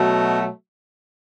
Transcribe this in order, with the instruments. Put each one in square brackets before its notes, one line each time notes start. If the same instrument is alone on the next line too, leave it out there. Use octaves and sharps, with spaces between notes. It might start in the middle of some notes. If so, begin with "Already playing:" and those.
Already playing: [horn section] B2 F#3 A3